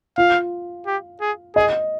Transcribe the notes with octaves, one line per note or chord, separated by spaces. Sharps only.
F4 F5
G4
G#4
G#4 D#5